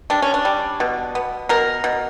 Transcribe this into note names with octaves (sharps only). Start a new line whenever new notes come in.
G3 D4
C#4
D4
G3
B2
B3
B2 A#4
B2